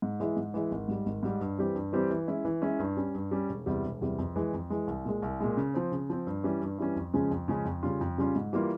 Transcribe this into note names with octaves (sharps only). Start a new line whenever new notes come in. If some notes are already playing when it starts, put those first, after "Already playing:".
G#2
E3 G#3 E4
G#2
E3 G#3 E4
G#1
G#2 G3
G#1
G#2 G3
G2
E3 G3 C4 G4
G2
E3 G3 C4 G4
E3
G#3 C#4 E4
E3
G#3 C#4 E4
G2
G3 C#4
G2
G3 C#4
E1
E2 C3 G3
E1
E2 C3 G3
F2
E3 G#3
F2
E3 G#3
C2
A#2 G#3
C2
A#2 G#3
C#3
F3 C4
C#3
F3 C4
G2
E3 G3 C#4
G2
E3 G3 C#4
F2
C#3 F3 G#3 C#4
F2
C#3 F3 G#3 C#4
F2
C#3 G3 C#4 F4
F2
C#3 G3 C#4 F4
G#2
E3 G3 A#3 F4